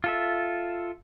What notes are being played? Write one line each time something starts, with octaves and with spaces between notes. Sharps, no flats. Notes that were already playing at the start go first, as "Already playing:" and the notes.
F4 A4 E5